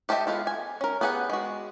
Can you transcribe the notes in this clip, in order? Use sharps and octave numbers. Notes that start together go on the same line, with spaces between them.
G4 A4 D#5 E5 G5
G#3 B3 F4 A4
G#5
C#4 A#4
B3 G4 G#4 F5 F#5
G#3 F#4